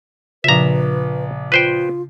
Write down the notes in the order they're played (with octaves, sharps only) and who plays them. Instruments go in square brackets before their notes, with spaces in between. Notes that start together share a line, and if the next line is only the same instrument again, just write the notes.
[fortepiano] A#1 F3 [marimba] C#3 [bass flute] B4 [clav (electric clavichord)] E5 A#5
[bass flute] F4 [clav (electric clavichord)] B4 C5 G5